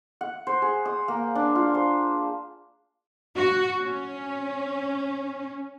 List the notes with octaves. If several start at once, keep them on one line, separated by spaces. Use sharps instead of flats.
F#5
C5
G#4
D#6
A#3
D4
F4
C5
F#4
C#4